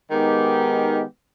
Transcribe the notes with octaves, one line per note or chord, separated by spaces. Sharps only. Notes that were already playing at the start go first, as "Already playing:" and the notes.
D#3 G#3 B3 D#4 G4